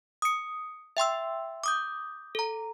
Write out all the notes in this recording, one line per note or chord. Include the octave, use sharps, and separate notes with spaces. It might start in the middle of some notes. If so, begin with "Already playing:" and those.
D#6 C#7
E5 G5 C6 E6
D6 D#6 G6
A4 A#5